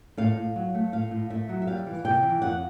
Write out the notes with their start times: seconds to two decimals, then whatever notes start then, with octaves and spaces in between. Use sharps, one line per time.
0.17 A2 F5
0.37 A2
0.56 F#3
0.74 A3
0.92 A2 F5
1.11 A2
1.30 A2 E5
1.49 F#3
1.62 E5
1.67 G3 F5
1.87 E3
2.05 C3 G5
2.23 E3
2.42 F2 F#5